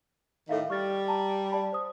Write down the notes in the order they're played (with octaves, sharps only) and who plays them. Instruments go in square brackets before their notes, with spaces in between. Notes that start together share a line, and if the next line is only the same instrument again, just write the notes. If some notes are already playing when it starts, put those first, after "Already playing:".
[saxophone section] A2 D#3 [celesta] A4 E5 F5
[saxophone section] G3 [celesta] C#6 F6 A6
[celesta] A5 A#5
D5 A5 B5
C5 D#6